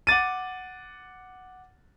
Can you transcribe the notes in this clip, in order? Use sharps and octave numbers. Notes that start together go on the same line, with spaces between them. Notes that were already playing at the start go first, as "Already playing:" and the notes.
F#5 D6 A6 D#7